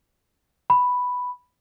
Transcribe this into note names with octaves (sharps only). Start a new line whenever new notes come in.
B5